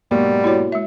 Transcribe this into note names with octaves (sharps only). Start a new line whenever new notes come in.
G#2 B2 F#3 G3 A#3
E4 F#4 C#5
G#3 E5